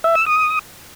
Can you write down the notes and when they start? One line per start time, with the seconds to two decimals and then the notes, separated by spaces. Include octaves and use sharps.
0.04 E5
0.15 E6
0.26 D#6